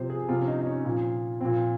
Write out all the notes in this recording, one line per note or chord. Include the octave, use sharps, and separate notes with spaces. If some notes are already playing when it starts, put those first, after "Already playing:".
Already playing: C3 F3 C5
G#4
C3 F3 F4
C#4
D#4
D#4
C#4
A#2 F3
A#2 F3 C4